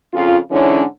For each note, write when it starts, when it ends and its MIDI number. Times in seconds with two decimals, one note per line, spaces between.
0.14 0.36 41
0.14 0.36 49
0.14 0.36 65
0.51 0.82 44
0.51 0.82 50
0.51 0.82 52
0.51 0.82 61